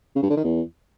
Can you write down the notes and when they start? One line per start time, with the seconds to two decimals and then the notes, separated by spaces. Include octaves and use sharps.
0.15 C#3
0.23 G2
0.30 D3
0.37 D#3
0.44 E2